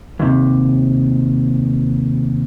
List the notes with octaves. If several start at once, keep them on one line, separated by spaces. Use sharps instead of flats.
D#2 C3